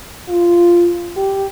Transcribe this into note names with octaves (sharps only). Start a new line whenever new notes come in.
F4
G4